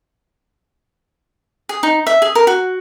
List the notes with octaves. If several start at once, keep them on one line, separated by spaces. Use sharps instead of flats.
G#4
D#4
E5
G#4
A#4
F#4